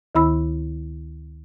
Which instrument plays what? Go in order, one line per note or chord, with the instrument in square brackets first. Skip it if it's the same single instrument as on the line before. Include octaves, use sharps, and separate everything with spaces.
[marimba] D2 D#3 E4 B5 E6